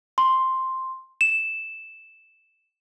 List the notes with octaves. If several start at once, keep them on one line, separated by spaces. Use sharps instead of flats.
C6
E7